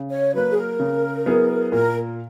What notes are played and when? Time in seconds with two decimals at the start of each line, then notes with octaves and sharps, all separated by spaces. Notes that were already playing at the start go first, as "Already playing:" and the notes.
Already playing: C#3
0.10 C#5
0.34 F#3 A#3 B4
0.51 G#4
0.57 A#4
0.80 C#3
1.26 F#3 B3 E4 G#4
1.71 A#2 A#4